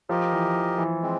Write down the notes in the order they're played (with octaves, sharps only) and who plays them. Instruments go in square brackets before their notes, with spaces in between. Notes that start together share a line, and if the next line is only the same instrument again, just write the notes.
[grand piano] F3 [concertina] G4 A#4 D#5
[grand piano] E3
E3
E3
[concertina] G#3 C4